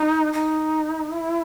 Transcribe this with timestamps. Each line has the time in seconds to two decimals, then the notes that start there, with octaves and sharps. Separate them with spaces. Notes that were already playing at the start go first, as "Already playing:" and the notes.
Already playing: D#4
0.33 D#4
1.12 E4